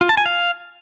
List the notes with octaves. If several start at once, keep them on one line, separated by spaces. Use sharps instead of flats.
F4
A5
G#5
F5